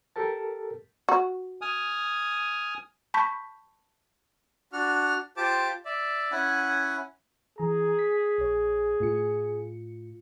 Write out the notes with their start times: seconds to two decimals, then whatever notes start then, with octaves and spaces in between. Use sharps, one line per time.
0.16 G4 A4 A#4 A5
1.09 F#4
1.61 G#5 D#6 F6
3.14 A5 B5 C#6 G6 B6
4.73 D4 F#4 F6
5.37 F4 G4 C5 A5 D6
5.85 D5 E5
6.32 C#4 E4 F#5 G#5
7.58 E3 G#4 A#5
7.99 B6
8.38 A#1 C#5
9.00 A2 F4 C#7